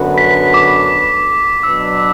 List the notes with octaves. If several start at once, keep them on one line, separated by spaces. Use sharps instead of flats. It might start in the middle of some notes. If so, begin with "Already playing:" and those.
Already playing: F#2 D3 B3 F#4 B4
B6
D6
B2 F#3 D4 B4 E6